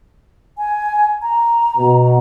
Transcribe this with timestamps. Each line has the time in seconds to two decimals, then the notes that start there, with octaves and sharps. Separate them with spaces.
0.58 G#5
1.22 A#5
1.78 B2